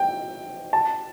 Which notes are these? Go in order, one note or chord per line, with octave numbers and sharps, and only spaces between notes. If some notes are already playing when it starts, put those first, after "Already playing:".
Already playing: G5
A5